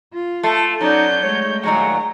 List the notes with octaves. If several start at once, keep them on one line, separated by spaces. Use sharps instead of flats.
F4
A3 C6
F#3 B3 C#4 D#4 D5 G6
G#3 A3 C#5
A#2 D#3 F#3 A#5 C#6